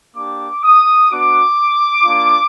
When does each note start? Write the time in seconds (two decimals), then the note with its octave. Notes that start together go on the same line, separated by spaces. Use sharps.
0.16 A#3 D4 G4 D6
0.63 D#6
1.10 B3 D4 F#4 D6
2.04 A#3 D4 F4